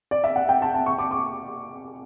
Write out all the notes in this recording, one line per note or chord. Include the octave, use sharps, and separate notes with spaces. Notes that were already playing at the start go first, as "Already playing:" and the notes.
D5
E5
F#5
G5
A5
A5
C#6
D6
D6